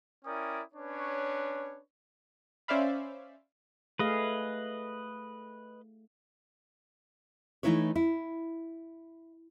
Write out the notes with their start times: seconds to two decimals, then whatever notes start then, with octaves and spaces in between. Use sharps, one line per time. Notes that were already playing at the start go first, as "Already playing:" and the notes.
0.25 C#4 E4 A#4 D5 G5 D#6
0.74 C#4 D4 B4 C#5
2.68 C#4 C5 D5 E5 F5 B5
3.99 A3 G#4 B4 D#5 F5
7.63 E3 A3 D#4 E4 B4 C#5
7.96 E4